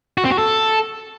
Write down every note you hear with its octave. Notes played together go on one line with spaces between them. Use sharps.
F#4
C4
F#4
A4